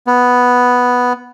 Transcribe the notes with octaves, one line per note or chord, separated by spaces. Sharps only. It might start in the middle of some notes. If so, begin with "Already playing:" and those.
B3